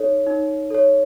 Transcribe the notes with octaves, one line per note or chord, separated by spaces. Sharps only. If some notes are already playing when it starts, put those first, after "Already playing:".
Already playing: D#4 A4 C#5
D#4
A4 C#5